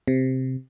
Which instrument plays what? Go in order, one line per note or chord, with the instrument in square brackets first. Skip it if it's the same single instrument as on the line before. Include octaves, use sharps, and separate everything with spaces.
[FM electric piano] C3